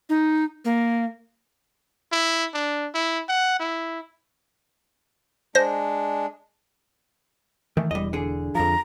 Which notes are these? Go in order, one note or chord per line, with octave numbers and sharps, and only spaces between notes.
D#4
A#3
E4
D4
E4
F#5
E4
G#3 D4 C5 A#6
D#3 E3 A3
E1 E2 G3 D#5
D3 G#4
F2 F3 A#5